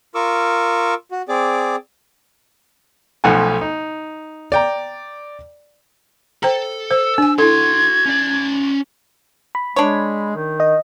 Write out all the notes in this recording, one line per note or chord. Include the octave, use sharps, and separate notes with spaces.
F4 A#4 C#6 D6 E6
F#4
C4 G#4 D5 D6
B1 F3 A3 F#5 G#5
D#4
D5 G5 A#5
A4 C5 G5 A#5
C5 E6
D4 G#5
E4 F#4 A4 C6 G#6
C#4 D5
B5
G#3 D4 C#5
D#3
D#5